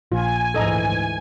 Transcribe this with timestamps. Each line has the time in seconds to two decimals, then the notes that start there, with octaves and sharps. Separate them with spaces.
0.12 A#1 F4 G#5
0.54 D2 G#2 E3 A4 D#5 A#5